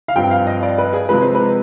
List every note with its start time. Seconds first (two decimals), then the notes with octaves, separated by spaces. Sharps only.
0.08 F5
0.16 G2 F3 C4 G5
0.31 F5
0.47 D#5
0.63 D5
0.78 B4
0.93 G#4
1.09 C3 F3 G#3 B4
1.22 C5
1.35 B4